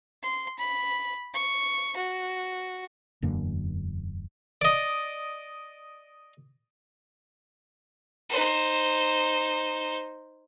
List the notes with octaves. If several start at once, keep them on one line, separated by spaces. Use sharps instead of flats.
C6
B5
C#6
F#4
E1 F#2 D3 A#3
D5 D#5
D#4 C5